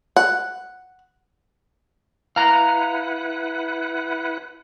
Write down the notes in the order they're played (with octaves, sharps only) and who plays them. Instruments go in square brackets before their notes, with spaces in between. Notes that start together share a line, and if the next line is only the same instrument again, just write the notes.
[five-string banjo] F#5
[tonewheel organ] E4 B4 F#5 [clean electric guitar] F5 A#5